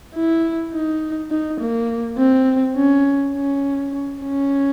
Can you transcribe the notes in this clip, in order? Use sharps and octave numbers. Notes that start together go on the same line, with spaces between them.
E4
D#4
D#4
A#3
C4
C#4
C#4
C#4